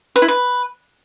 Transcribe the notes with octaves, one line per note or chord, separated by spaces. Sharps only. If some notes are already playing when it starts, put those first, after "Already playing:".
B4
E4
B4